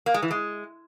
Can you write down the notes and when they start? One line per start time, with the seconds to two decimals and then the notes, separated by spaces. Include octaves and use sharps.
0.06 A#3
0.14 G#3
0.22 E3
0.31 G#3